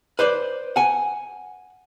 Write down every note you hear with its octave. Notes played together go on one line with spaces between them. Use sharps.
B4 C5 D5
F#5 G#5